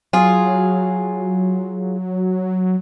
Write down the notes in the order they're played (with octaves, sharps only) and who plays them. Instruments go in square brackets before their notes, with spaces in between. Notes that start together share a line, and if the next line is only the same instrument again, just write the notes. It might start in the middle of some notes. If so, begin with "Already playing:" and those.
[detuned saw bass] F#3 [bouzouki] F4 G#4